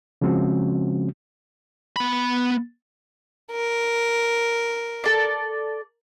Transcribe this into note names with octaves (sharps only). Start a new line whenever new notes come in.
C#3 F3 G#3 C4 C#4 F#4
B3 B5
A#4
A4 D5